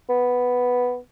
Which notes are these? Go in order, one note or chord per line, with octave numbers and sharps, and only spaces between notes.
B3